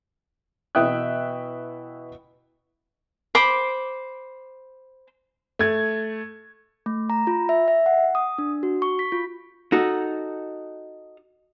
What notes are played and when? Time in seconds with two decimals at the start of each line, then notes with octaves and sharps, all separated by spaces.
0.75 B2 E3 E5 G5 D#6 F#6
3.35 C5 B5 D6
5.59 A3 G#6
6.86 A3
7.10 A#5
7.27 F4
7.49 E5
7.68 E5
7.86 F#5
8.15 D#6
8.38 D4
8.63 F#4
8.82 C#6
8.99 B6
9.12 F4
9.72 D#4 F#4 A4